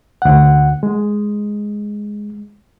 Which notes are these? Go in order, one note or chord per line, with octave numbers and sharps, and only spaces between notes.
D2 F#5
G#3